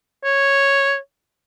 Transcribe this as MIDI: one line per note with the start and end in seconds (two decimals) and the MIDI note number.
0.24 0.97 73